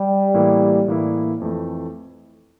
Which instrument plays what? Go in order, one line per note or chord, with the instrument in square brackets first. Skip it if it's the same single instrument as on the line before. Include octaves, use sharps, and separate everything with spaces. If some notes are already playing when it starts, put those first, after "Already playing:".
Already playing: [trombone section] G3
[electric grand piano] A2 E3 A#3 E4
A2 E3 A#3 E4
F2 E3 A3